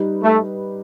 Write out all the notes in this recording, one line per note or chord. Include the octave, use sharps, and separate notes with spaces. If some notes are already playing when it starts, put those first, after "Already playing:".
Already playing: G3 D#4 G4 B4
A3